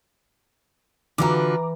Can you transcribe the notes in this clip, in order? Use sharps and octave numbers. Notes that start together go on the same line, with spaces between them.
D3 E3 F4 F#4 B4 A#5 D6